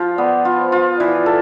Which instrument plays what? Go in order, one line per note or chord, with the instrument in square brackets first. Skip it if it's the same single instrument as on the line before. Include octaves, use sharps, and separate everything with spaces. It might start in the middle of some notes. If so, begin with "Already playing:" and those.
Already playing: [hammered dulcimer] F3 F4
[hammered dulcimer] B3 [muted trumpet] D5
[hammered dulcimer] F4
[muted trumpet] C5
[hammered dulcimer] F4
[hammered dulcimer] E3 [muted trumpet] D5
[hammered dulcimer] A4